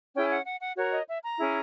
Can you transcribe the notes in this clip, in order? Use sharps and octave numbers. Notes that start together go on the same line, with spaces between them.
C#4 E4 G#4 G5
F#5
F#5
F#5
F#4 A#4 C#5
D#5
E5
A#5
C#4 E4 G#4